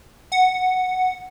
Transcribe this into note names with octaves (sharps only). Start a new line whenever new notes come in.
F#5